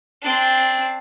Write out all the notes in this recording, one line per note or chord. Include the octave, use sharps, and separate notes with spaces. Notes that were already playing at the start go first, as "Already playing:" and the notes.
C4 D4